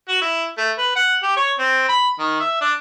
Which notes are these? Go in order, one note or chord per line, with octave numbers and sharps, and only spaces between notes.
F#4
E4
A3
B4
F#5
G4
C#5
C4
B5
D#3
E5
D4